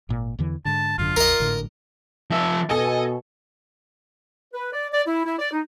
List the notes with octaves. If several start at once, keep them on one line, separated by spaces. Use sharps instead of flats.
G#1 A#2
E2 D3 E3
G#2 D3 A5
G#1 F#2 D3 F4
A#1 F2 A#4 D#5
G#1 A2 D3
F3 E5
B2 A4 D#5 G#5
B4
D5
D5
E4
E4
D5
D#4